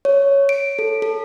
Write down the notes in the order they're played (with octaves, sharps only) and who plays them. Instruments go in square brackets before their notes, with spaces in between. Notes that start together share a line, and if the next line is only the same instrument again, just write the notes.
[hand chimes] C#5
D7
A4
A4